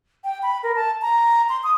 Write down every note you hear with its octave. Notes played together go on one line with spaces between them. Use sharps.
G5
B5
A#4
A5
A#5
C6
D#6